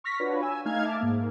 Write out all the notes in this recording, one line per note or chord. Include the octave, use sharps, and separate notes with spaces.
C#6 F6 A#6 B6
D4 F4 F#4 B4 C#5
G#5 E6
A3 D#4 F5 F6 G#6
E5 A5 D6 F6
G#2 A#3